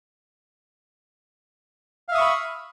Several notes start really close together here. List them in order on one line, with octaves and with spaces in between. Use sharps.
F5 E5 D#6 C#6 B5